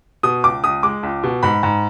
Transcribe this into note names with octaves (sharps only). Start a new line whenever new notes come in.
B2 D#6
C#2 D6
C#2 D#6
G#3 D6
C#2
B2
G#2 B5
G#2